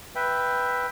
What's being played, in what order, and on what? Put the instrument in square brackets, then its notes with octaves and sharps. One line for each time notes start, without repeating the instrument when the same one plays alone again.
[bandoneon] B4 E5 G5